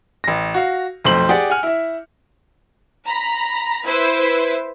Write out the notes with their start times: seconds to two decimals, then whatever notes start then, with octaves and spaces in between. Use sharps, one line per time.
0.24 A1 A#6
0.54 F#4 F5
1.05 B1 F2 A3 C5 C6 F#7
1.29 G4 G#4 D5 F#5
1.50 F#5 G#5 F6
1.63 E4 E5
3.07 A#5 B5
3.85 E4 B4 C5